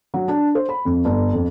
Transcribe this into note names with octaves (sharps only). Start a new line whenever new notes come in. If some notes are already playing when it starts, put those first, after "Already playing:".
F#3
D4
C5
B5
F2
G1
F2